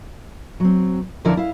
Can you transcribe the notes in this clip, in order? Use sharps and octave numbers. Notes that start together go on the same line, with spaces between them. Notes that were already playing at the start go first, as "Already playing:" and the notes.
F#3 C4
F2 D3 F3 E4 A#4 D5
E4 F5